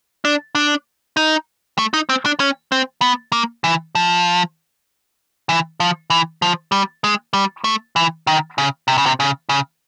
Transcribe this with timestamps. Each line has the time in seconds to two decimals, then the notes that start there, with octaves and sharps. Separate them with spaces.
0.25 D4
0.55 D4
1.17 D#4
1.79 A3
1.94 D#4
2.09 C4
2.26 D4
2.40 C#4
2.72 C4
3.02 B3
3.32 A#3
3.64 E3
3.95 F3
5.49 E3
5.80 F3
6.10 E3
6.42 F3
6.72 G3
7.04 G#3
7.33 G3
7.64 A3
7.96 E3
8.27 D#3
8.58 C#3
8.88 C3
8.98 C#3
9.06 C3
9.20 C#3
9.49 C#3